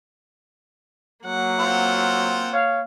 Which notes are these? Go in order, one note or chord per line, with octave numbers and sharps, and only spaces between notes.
F#3 A#3 F#5
C4 F4
C#5 F5